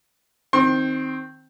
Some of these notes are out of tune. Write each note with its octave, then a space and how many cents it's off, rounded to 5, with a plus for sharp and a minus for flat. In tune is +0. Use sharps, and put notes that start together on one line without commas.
D#3 +0 C4 +0 C6 +40